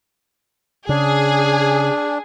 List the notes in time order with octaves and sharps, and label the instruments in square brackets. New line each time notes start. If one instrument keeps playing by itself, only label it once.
[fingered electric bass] C#3 [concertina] D4 [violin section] G#4